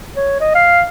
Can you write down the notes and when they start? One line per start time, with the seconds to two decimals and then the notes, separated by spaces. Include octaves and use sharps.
0.16 C#5
0.41 D#5
0.55 F5